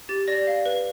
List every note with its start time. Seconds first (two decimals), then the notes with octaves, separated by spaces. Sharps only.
0.09 G4 A6
0.28 D5 A#6
0.47 F5
0.66 B4